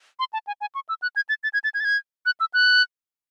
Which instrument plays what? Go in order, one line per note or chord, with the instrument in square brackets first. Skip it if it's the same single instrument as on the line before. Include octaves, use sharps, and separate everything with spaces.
[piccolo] C6
A5
G#5
G#5
C#6
E6
F#6
G#6
A6
A6
G#6
A6
G#6
A6
G#6
F#6
E6
F#6